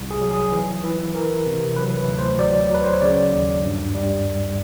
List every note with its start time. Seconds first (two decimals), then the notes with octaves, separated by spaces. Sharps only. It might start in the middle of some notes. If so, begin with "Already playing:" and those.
Already playing: C2
0.11 G#4
0.21 F#3
0.31 G#4
0.52 E3
0.84 E3
1.15 E3 A#4
1.46 C3
1.76 F#3 B4
1.97 B4
2.08 D2
2.19 C5
2.39 F#3 D5
2.71 F#3 B4
2.84 C5
2.93 C#5
3.02 C#3 D5
3.32 D#2
3.64 G2
3.95 G3